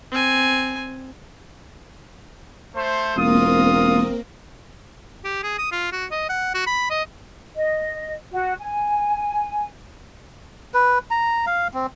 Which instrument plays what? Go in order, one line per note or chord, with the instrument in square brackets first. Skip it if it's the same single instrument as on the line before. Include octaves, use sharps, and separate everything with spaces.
[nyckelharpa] C4 G#5
[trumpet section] A3 C5
[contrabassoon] E1 [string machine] A#3 C4 A#4 [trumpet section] F4 D#6
[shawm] G4
G#4
D#6
F4
F#4
D#5
F#5
F#4
B5
D#5
[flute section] D#5
F#4
G#5
[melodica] B4
A#5
F5
C4